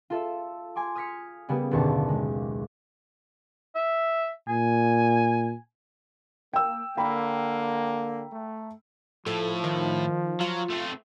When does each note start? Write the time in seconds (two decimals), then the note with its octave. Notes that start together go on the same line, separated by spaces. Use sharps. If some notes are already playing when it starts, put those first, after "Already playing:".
0.10 F4 A4 E5
0.76 G#5 C6 D6
0.95 D#6 F6 G#6 B6 C#7
1.49 C#3 G3 A#3 B3
1.71 F#1 D#2 B2 D3 A5 C#6
2.09 G#3
3.76 E5
4.48 A#2 G#5
6.53 A#3 G5 E6
6.97 D3 A#3 G5 A#5 B5
8.32 A3
9.26 A2 F3 A4
9.64 D#3
10.41 F#3 F4
10.70 A3 C4